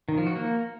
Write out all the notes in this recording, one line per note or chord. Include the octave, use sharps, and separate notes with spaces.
D#3
F3
F#4
A#3